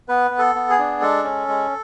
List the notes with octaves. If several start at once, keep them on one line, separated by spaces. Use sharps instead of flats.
B3 B4
B3
A4
B3
G#4
D4
G#3 A4
C#4
G#3